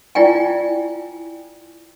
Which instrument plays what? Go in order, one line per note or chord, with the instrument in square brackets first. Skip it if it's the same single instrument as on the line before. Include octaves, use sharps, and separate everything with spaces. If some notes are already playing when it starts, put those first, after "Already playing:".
[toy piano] E4 F4 D5 G5 G#5